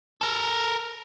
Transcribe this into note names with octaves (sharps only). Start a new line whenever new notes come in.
A4 A#4